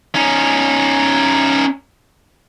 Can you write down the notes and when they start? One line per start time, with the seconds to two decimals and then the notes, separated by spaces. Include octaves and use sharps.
0.15 C#4 D#4